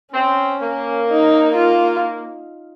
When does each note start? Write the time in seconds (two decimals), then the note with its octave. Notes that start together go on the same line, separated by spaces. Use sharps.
0.14 C4 C#4
0.62 A#3
1.08 D#4
1.55 F4